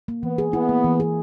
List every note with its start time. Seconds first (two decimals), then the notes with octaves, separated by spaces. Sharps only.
0.08 A#3
0.23 E3 B3
0.38 G#4
0.53 B3 E4
0.69 A#3
0.84 E3
1.00 G#4